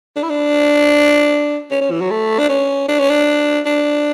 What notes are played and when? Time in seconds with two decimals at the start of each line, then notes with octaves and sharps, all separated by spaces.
0.16 D4
0.23 E4
0.30 D4
1.71 C#4
1.81 C#4
1.91 E3
2.01 F#3
2.11 A3
2.39 D4
2.49 C#4
2.88 D4
2.99 C#4
3.10 D4
3.66 D4